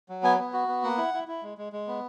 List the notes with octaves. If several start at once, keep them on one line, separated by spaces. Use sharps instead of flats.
F#3
B3 G#5
B3
F#4
B3
A#3 F#5
E4
E4
E4
G#3
G#3
G#3
B3